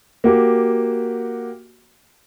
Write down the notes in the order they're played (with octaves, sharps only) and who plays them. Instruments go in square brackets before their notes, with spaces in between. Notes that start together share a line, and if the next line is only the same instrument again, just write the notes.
[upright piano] A#3 F#4 G4